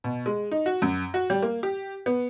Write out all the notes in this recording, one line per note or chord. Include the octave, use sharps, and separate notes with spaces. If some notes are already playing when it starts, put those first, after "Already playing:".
B2
G#3
D#4
F#4
F#2
F#4
G3
A#3
G4
B3